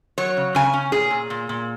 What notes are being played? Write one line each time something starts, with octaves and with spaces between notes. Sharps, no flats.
F#3 C#5
C#3
C#3 G#5
C#4
A#2 G#4
A#2
A#2
A#2